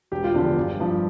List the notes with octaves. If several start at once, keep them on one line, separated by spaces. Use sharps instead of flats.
E1 G4
F4
E2 D3 F3 G4
G1
G2 F3